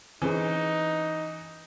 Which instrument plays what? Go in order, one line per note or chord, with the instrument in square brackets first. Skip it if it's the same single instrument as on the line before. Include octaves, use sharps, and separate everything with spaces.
[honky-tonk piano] E3 [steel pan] C4 C#4 G#4 [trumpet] D#4